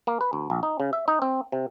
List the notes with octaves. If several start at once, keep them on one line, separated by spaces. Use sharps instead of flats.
A#3
B4
D2
A#1
D#4
C#3
E5
D#4
C4
C3